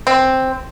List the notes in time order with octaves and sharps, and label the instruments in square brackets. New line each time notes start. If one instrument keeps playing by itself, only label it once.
[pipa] C4